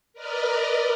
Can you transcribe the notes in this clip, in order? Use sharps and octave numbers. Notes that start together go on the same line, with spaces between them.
A#4 B4 D5 D#5 F6